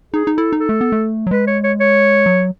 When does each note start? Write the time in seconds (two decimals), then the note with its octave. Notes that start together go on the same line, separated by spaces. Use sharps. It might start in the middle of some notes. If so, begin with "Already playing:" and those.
0.14 D#4 G#4
0.27 D#4
0.38 E4 A4
0.53 D#4
0.60 A4
0.69 A3
0.81 B3
0.92 A3
1.27 F#3
1.31 G#3 B4
1.48 C#5
1.64 C#5
1.80 C#5
2.26 F#3